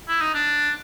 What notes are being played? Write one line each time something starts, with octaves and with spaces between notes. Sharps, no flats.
E4
D#4
D4